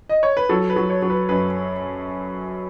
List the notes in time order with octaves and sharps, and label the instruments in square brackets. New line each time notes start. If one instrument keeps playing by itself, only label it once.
[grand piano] D#5
C#5
B4
F#3 A4
B4
F#3
C#5
F#3
B4
F#2 B4